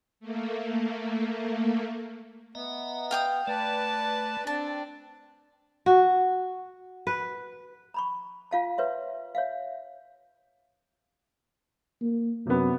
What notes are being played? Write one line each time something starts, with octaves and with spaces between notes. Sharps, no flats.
A3 A#3
B3 D#5 E5 A#5
F5 G5 D#6
A3 B4 D5 A5
C4 D4 A5
F#4
B4
A#5 B5 C#6
F4 F5 A5
B4 C#5 E5 C6
C#5 E5 F5
A#3
F#2 C3 B3